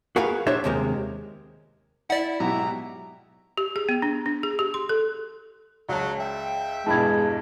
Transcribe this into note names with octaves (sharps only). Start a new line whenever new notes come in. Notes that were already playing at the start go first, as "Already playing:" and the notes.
F#4 G#4 A#4 B4 F5
D4 G4 C5 C#5 E5
D#2 C3 G#3 A#3
E4 D5 F#5
G#2 B2 F#3 E4 G4 E5 A#5
G4
G#4
B3
D4
D4
G#4
G4
C6
A4
C#2 F#3 D5 A5
E5 G5
E2 G2 B2 G#3 A5 B5 G#6